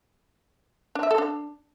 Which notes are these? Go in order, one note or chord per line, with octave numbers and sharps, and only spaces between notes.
D4
E5
A4
D4